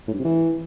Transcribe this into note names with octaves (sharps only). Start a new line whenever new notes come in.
A2
G2
C3
E3